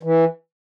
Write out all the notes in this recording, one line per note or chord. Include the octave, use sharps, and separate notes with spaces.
E3